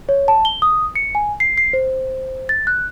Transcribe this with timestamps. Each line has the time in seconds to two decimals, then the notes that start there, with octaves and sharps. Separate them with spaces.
0.09 C#5
0.28 A5
0.45 G7
0.62 D#6
0.96 C#7
1.15 G#5
1.40 C7
1.58 C7
1.73 C5
2.49 A6
2.67 F#6